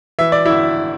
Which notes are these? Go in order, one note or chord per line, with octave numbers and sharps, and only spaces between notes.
E3 E5
D5
G1 E4 E5